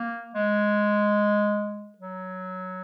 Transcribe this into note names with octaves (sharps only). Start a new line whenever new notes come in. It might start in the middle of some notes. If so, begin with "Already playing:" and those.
Already playing: A#3
G#3
F#3